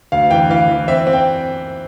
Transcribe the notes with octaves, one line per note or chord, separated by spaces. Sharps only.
D2 F5
E3 G5
E3 F5
E3
C4 E5
C4
G5